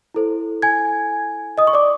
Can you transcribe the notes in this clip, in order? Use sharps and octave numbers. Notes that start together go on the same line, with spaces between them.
E4 A4 C5
G#5 G#6
D#5 D#6
C#6
D5 D6